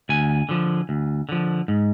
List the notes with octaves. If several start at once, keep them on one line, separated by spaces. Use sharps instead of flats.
D2 G#5
D3 F3
D2
D3 F3
G#2